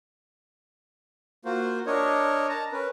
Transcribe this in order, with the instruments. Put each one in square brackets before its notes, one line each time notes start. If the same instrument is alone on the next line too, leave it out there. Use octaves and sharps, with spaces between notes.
[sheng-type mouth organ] A#3 F4 F#4 C5
D4 A#4 C#5 D#5
A5 A#5
C#4 A#4 B4